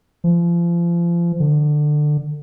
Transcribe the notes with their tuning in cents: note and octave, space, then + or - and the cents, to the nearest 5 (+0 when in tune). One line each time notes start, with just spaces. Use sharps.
F3 -30
D3 +20